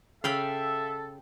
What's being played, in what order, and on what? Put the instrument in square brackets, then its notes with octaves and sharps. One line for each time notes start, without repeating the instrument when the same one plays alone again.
[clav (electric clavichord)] C#3 [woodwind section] A4 [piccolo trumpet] E5 [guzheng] F5 G5 B5